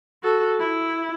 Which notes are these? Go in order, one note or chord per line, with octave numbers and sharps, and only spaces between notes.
F#4 A4
E4